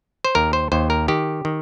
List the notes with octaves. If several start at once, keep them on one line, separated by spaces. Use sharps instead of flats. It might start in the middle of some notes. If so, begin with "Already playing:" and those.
C5
D#2 A#4
C5
D#2 C5
A#4
D#3 G4
D#3